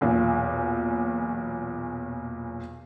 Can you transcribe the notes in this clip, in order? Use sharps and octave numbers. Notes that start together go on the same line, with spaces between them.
B1 E2 A#2